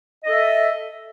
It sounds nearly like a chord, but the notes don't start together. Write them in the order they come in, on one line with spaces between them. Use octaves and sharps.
D#5 A4 E5